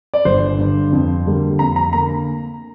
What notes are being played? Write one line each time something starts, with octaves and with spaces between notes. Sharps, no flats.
D5
G1 C5
G2 D3
F2
D3 G3 A#3
F2 A#5
A#5
D3 A#3 A#5